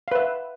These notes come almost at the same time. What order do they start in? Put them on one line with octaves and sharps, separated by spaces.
F5 B4 E5